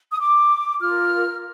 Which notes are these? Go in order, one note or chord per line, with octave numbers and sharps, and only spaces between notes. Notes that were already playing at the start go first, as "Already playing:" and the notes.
D#6
D6
F4 A#4 F6